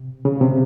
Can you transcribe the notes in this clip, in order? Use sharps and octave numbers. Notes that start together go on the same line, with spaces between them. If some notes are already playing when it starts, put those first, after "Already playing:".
Already playing: C3
C#3
C3